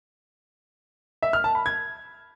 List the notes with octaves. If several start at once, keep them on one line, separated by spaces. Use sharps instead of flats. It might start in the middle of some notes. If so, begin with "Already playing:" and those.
E5
F6
A5
B5
G#6